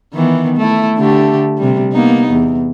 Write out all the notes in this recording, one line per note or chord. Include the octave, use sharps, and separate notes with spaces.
D#3 E3 B3
A3 E4
D3 A3 G4
C3 G3
A#3 B3 D#4
E2